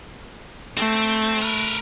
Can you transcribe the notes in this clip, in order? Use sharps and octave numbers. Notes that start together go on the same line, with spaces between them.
A3 C4
A#4 B4